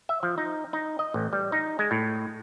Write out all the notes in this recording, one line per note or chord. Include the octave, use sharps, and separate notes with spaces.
E5
F3
D#4
D#4
D#5
A1
G3
D#4
G#3
A2